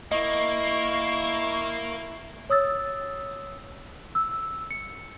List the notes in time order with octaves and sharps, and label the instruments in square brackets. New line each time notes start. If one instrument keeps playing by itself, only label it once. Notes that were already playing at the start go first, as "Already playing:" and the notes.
[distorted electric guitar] A#3 [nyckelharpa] E4 [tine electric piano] D#5 [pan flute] C#6
[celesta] C#5 D#6 E6 A6
E6
C#7